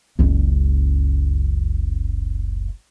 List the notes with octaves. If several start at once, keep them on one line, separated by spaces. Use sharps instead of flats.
F#1 C#2